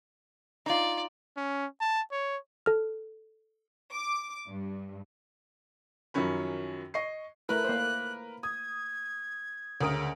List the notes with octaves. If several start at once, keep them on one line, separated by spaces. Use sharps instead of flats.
D#4 F4 D5
C#4
A5
C#5
A4 F6
D6
G2
F#2 D#3 F3 F#3 C#4 B5
D#5 C#6 C7
A3 E4 A#4 B4 F#6
A#3 C5
D#6 G#6
D2 C#3 A#4 D#6 D7